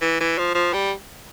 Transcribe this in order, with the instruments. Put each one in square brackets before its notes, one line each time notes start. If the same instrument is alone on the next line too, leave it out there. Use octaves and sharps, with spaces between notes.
[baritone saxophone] E3
E3
F3
F3
G3